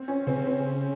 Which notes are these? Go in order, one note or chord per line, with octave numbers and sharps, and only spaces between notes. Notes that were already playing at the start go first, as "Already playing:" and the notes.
Already playing: C4
C#4
C#3 C4
C4